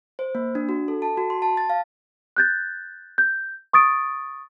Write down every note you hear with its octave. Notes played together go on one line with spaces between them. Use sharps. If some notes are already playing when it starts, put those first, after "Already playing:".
C5
A#3
D4
F#4
A4
A5
F#4
C6
A5
A6
F5
F#6 G6 A6
G6
C#6 D#6 A6 D7